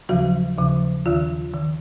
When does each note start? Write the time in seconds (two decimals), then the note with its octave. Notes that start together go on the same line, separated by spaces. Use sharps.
0.09 D#2 C#3 F3 F#3 F#4
0.57 D#2 C#3 F3
1.06 D#2 D#3 F4
1.54 D#3